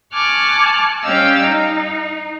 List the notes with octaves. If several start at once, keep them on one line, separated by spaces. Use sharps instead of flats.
G#5 A5 C#6 D6 F6 F#6
G3 C#4 D#5 F5 G5 E6
D#4